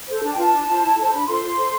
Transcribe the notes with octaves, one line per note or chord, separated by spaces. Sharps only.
A4 C5
D4 A5
G5
F4 B4 A5
D4
F4 C5
E4
A4 C5
D4 B5
F4 A4 C5 C6
F4
A4 C5